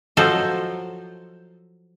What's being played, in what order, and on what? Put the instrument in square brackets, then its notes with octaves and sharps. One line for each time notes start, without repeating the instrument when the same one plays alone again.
[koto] F3 F#3 F#4 A4 C5 D#5